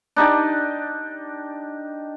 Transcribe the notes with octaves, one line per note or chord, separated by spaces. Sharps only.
D4 D#4 G4 D5